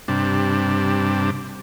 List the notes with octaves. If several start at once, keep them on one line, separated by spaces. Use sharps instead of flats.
G2 C3 D4